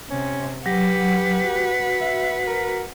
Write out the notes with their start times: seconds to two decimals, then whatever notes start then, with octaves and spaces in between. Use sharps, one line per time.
0.10 C3 C#4
0.66 F#3 G4 B4 F#5
1.44 F#4
2.01 E5
2.47 A#4